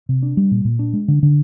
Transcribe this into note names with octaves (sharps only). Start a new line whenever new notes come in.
C3
D4
G3
A#2
A#2
D4
G#3
D3
D3